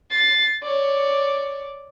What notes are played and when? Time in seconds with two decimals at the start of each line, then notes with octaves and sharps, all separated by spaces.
0.11 A6 C7
0.63 C#5 D5